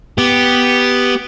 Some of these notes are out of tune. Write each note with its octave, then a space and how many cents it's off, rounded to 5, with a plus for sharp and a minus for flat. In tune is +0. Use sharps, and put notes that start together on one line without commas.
B3 +0 G4 +0